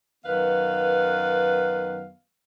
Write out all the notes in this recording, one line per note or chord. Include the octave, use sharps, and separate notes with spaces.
F#2 D#3 B3 B4 F5